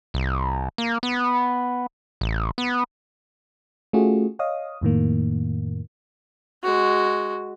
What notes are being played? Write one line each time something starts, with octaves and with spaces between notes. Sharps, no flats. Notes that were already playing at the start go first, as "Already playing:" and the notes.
C2
A#3
B3
A1
B3
A3 C#4 F4 F#4 G#4
C#5 D#5 F5 D#6
F2 A2 D#3 A#3
G#3 F#4